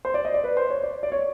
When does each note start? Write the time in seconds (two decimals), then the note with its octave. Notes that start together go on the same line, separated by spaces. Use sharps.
0.05 C5
0.14 D5
0.25 D#5
0.34 D5
0.44 B4
0.57 C5
0.70 C#5
0.83 D5
1.03 D5
1.12 C#5